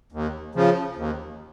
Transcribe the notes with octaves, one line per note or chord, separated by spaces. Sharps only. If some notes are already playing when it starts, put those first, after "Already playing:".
D#2
C#3 F3
D#2